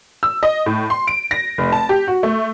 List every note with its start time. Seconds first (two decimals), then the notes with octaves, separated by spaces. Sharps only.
0.23 E6
0.43 D#5
0.66 A2
0.90 C6
1.07 D7
1.31 A#6
1.58 F1
1.72 A5
1.89 G4
2.08 F#4
2.23 A3